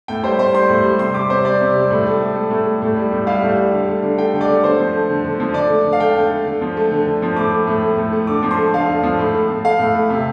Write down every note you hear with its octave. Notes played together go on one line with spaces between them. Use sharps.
A2 G5
G3 C5
A2 C5
G3 C6
A2
G3
C3 C6
G3 D6
C3 C5
G3 D5
C3
G3
A2
A3
A2
A3
A2
A3
A2
G3
A2
G3 F5
A2
G3
D3
A3
D3
A3 G5
D3
D5
A3
D3 C5
F3
A3
D3
D3
F3
D3 D5
A3
D3
F5
A3 G5
D3
A3
D3
F3
A3
D3
D3
F3
A2 D6
A3
A2
A3
A2
A3
D3 D6
F3
C6
A3
D3 F5
D3
F3
A2
A3
A2
A3 F5
A2
A3
C3